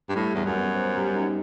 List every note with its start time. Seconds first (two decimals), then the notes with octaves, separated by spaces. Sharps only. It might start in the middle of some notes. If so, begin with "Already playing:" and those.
0.09 G2
0.15 A2 G3
0.35 E2 G3
0.45 F#2
0.56 B3
0.75 C5
0.96 G3
1.15 D#4